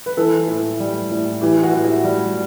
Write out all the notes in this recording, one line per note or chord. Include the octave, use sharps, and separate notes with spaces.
B4
E3 A4
A2
G3
A2
E3 G4
F#4
A2
E4
G3